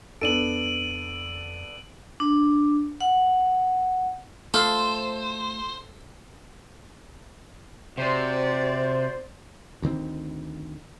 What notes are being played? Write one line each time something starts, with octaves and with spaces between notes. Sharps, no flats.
F2 B3 D4 A4 D7 D#7 F#7
D4
F#5
F3 A3 A4 C5 C6
C3 F#4 C5 D5
D2 D#3 C4